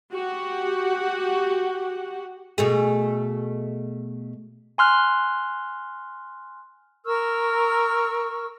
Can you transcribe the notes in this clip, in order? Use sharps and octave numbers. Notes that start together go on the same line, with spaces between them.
F#4 G4 F#5
B2 A3 G#4
G#5 C6 F6 F#6
A#4 C#6 E6 F6